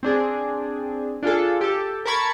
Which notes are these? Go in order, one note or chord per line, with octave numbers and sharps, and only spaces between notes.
C4 D4 G#4
D4 F4 G#4 A4
G4 A4
A#4 A5 B5 C#6 G#6